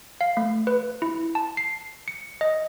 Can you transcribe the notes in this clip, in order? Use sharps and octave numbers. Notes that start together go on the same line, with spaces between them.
F5
A3
B4
E4
A5
C7
C#7
D#5